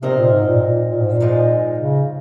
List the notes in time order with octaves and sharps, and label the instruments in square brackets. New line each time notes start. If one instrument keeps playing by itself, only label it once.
[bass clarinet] C3 [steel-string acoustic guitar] F3 C4 D#4 A#4 D#5
[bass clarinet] A#2
G#2
A#2
A#2
A#2
G#2
A#2
[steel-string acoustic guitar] G#2 F3 G#3 D#4
[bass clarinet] C#3